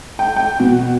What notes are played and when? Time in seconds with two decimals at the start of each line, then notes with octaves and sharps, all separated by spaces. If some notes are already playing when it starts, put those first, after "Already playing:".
0.19 G5
0.36 G5
0.60 B2